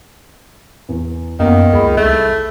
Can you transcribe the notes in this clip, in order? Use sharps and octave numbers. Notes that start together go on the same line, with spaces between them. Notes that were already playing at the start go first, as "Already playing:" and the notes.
E2
F#2 D#3 A#3 B3
C#2 G#4 B5
C2 A3